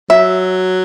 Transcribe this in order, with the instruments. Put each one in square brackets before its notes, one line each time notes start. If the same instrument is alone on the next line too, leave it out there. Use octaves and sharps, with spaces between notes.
[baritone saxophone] F#3 [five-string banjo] E5